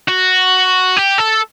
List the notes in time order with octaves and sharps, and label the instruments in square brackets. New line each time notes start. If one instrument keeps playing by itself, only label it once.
[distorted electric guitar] F#4
G4
A4